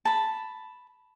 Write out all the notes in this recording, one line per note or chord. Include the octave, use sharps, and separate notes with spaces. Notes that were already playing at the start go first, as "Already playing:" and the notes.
A5 B5